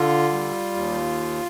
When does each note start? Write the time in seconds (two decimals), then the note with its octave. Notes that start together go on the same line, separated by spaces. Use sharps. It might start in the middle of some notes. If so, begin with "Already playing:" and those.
Already playing: D3 F4
0.31 G3
0.75 D#2